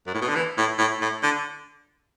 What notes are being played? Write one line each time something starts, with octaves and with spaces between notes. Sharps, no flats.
F#2
A2
B2
D3
E3
A2
A2
A2
D3